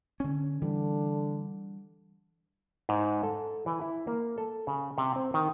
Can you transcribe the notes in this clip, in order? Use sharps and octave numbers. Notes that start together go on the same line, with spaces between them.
D3 C#4
D3 E3 G3
G#2
A4
E3
E4
A#3
A4
C#3
C3
C4
D#3